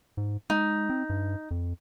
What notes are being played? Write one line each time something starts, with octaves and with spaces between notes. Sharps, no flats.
G#2
G#3 D#4
C4
G2
F2